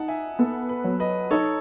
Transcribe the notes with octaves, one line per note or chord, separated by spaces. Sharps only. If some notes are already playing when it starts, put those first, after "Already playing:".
Already playing: D#4 F#5 A5
E5 G#5
B3 A4
B4
F#3
B4 D#5
D#4 A4 C#5